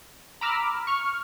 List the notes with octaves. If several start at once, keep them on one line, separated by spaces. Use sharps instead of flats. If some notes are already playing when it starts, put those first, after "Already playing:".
A#5 B5 D6 E6 F6
C#6 F6